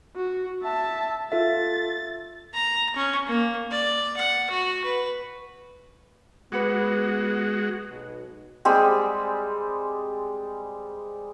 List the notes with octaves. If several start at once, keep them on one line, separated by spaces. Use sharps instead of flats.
F#4
E5 A5
F4 A4 E5 A6
A#5
C#4
A#3
D5
F#5
F#4
B4
G#3 B3 F#4 B4 F#5 D6
B1 B2
G3 G#3 C4